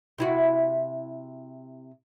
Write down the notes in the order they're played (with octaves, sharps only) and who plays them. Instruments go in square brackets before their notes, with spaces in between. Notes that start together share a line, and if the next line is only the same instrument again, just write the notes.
[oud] C3 E4 F#4